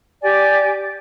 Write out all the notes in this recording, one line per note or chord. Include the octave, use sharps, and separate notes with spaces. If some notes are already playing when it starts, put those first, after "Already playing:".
G4 D5 G#5